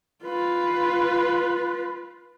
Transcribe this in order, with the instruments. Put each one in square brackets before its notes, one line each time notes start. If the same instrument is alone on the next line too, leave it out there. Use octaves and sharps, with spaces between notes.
[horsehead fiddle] F4 B4